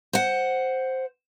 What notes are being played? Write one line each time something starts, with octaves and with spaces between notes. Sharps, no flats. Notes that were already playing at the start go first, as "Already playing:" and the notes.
C5 F#5